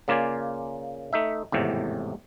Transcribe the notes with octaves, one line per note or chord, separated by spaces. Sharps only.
C#3 A#3 F4 D5 G#5
A3 D#4 E5
G#1 E2 A2 C3